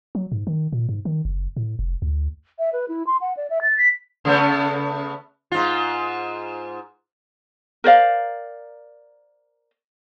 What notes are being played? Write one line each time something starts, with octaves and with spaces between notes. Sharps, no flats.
F#3
G#2
D#3
A#2
G#2
D#3
F#1
A2
F1
D2
E5
B4
E4
C6
F#5
D5
E5
A6
B6
C#3 A3 B3
G#2 F4
A#4 C5 D5 F5